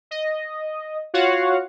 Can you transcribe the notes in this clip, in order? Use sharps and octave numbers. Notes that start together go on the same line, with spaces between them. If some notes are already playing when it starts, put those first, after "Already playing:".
D#5
F4 F#4 C#5 F5 F#5